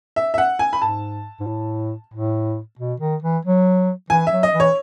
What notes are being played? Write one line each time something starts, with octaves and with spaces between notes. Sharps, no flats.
E5
E5
F#5
G#5
B5
G#2 A5
G#2
A2
A2
B2
D#3
E3
F#3
E3 G#5
F#3 E5
D#5
E3
C#5